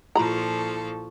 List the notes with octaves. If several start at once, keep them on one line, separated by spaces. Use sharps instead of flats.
A#2 F3 E4 F4 A4 A#5 B5 C#6